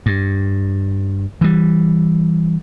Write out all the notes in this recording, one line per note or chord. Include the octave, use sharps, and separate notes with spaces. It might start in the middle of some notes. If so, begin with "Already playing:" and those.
G2
E3 G3